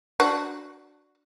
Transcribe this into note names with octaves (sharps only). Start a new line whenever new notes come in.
D4 F#4